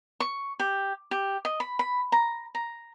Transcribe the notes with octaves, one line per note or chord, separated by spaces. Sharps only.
C#6
G4
G4
D#5
B5
B5
A#5
A#5